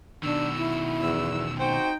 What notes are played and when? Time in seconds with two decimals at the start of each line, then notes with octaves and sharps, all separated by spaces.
0.23 B2 D#3 D4 E6
0.56 E4
1.01 E2 E6
1.59 C4 D#4 F#4 C5 G5